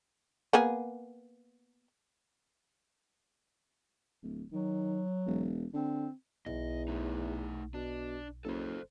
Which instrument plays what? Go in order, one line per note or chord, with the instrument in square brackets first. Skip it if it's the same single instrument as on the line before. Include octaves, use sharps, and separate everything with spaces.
[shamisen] A#3 B3 G#4
[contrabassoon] D1
[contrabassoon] D#3 [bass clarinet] F#3
[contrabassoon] E1
[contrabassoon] D3 [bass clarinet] C4
[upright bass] B1 [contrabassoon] E2 [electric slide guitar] D#5
[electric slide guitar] A3 D#4
[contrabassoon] B2 [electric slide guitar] D4
[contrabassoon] F#1 [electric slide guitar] A4 C5